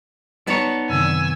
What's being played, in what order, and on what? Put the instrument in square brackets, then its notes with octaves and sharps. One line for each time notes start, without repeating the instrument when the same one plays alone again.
[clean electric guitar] B3 C#5 [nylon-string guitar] D#4 D5 A5
[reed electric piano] F#2 C3 D#3 [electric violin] G#5 E6